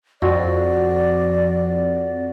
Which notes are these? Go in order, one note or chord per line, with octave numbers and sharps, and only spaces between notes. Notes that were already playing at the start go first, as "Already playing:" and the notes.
F2 F#4 D5